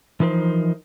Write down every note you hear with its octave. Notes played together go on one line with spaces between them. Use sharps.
E3 F3 D#4 A#4 C5